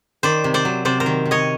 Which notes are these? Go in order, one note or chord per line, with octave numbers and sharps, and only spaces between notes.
D#3 C5 D5
C3
C5 D5
F#3
C3 C5 D5
A#4 C5
D#3
C3
C#5 D#5